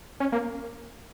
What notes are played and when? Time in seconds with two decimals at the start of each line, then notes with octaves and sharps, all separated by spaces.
0.20 C#4
0.32 A#3